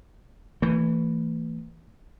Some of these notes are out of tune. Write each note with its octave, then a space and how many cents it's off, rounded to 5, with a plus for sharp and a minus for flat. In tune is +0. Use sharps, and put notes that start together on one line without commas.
E3 +0 A3 +45